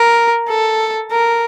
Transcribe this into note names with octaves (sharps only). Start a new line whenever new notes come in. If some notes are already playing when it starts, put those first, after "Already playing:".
Already playing: A#4
A4
A#4